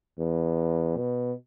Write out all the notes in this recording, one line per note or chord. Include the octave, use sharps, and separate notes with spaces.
E2
B2